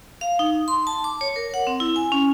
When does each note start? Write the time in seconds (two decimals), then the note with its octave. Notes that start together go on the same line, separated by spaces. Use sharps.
0.21 F5
0.39 D#4
0.68 C6
0.87 A5
1.04 D6
1.21 C#5
1.36 A#4
1.54 F#5
1.67 C4
1.80 E4
1.96 G#5
2.12 C#4